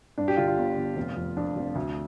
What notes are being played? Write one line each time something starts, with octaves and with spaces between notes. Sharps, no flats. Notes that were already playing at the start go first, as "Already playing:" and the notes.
G2 D4
G4
D3 F4
F4
G1
G1
F1
F2
F2 D4
F1
D2